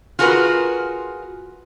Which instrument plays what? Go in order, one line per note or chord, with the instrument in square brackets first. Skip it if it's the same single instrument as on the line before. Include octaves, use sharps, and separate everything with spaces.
[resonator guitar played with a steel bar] F4 F#4 G#4 A#4 B4